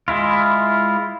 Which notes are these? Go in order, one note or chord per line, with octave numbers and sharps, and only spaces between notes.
G#3 E4 F4